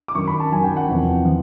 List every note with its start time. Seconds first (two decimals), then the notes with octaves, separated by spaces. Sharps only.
0.08 D6
0.15 F#2 D#3 F#3 C#6
0.27 B5
0.40 A5
0.52 F#2 D#3 F#3 G#5
0.64 G5
0.77 F#5
0.89 E2 C3 F3
1.25 F3